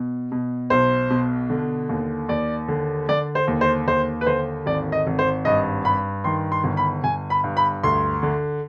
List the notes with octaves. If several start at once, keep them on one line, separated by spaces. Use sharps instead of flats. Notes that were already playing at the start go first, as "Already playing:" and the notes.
Already playing: B2
B2
B1 C5
B2
D3
D#2
D#2 D5
D3
D3 D5
C5
D#2
C5
D#2 C5
B4
D3 C5
G#1 D5
D#5
G#1
C5
G2 D#5
G2 B5
D#3 C6
C6
G1
B5
G1 G#5
B5
G2
B5
D2 C6
D3